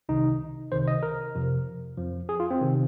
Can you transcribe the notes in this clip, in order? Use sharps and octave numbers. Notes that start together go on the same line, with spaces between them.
C2 C3 D#3 D#4
C2 C3 D#3 C5
D#5
A#4
F2 C3 F3
F2 F3
G#4
F4
C4
C3 D#3